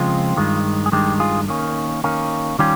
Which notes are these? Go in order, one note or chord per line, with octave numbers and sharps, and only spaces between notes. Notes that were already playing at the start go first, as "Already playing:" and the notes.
Already playing: C#3 F3 G#3 C4 F4
G2 D#3 G#3
G#4
G2 D#3 G#3 G4
F4 G#4
D#3 A#3 C#4
D#3 A#3 C#4
D#3 G3 C#4 F4 G4